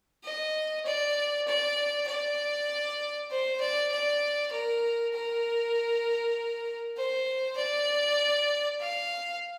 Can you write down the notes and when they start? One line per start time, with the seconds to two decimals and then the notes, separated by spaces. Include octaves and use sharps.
0.24 D#5
0.86 D5
1.47 D5
2.08 D5
3.31 C5
3.60 D5
3.92 D5
4.52 A#4
5.14 A#4
6.97 C5
7.57 D5
8.80 F5